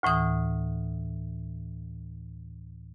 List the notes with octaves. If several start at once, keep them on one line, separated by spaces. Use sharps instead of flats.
D2 A2 E3 D#6